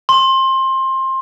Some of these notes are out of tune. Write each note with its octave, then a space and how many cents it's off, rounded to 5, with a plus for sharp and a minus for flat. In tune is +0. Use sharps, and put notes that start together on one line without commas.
C6 +20